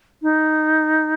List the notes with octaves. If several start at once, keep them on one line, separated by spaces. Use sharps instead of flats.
D#4